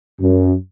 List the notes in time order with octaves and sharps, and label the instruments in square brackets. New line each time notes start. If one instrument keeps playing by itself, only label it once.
[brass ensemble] F#2